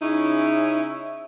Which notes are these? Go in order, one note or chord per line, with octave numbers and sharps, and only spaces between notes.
C#3 C#4 D#4 E4